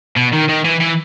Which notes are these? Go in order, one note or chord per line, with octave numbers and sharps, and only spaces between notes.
B2
D#3
D#3
E3
E3